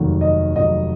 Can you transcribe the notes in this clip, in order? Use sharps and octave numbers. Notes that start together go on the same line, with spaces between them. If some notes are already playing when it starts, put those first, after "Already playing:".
Already playing: F1 D#2 D#3 F#3
D#5
F1 D#2 D#3 F#3 D#5